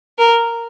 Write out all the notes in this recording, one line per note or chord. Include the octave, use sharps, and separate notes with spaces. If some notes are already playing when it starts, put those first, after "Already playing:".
A#4